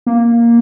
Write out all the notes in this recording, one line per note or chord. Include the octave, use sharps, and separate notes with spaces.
A#3